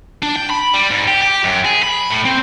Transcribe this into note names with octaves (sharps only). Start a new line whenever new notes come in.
D4
G5
B5
G3
G#2
G4
G4
F#2
G#4
B5
A2
C4